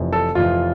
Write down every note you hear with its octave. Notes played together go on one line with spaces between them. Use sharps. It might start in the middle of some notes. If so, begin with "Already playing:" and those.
Already playing: F1 F2 E3
A4
F1 F2 E3 F4